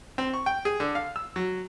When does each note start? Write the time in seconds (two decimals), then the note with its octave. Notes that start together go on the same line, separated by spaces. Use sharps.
0.18 C4
0.34 C#6
0.46 G5
0.65 G#4
0.80 D3
0.95 F5
1.16 E6
1.36 F#3